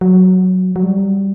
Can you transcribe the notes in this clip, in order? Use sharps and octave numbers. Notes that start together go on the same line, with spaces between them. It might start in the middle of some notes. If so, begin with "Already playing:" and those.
F#3
F#3
G3